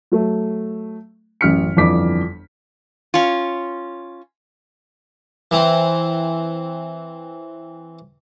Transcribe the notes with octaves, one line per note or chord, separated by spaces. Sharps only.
F#3 A3
A1 F#2 F6 B6 C#7
G1 F2 E3 D4 D6 B6
C#4 F4
E3 C4